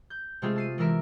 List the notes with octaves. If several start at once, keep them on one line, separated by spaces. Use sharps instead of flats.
G6
C3 G#3 A3 C4 F4 G#4
A5 C7 D#7
E3 G#3 E4 A#4 E5 D7